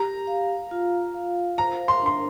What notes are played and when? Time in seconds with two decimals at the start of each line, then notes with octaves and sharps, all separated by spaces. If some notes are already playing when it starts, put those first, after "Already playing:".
Already playing: G4 A#5
0.27 F5
0.71 F4
1.14 F5
1.58 C5 A#5
1.88 C6
2.02 D4 C6